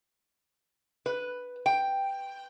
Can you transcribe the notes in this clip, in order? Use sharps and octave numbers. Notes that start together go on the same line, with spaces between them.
B4
G5